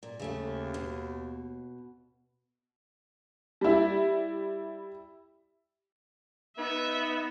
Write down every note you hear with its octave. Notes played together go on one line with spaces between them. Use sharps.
A#2
D#2 C#3 A3 G4
B2
G3 E4
B3 D#4 E5